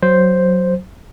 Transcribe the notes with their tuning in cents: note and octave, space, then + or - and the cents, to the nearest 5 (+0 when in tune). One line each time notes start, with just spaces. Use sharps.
F#3 +0 C5 +0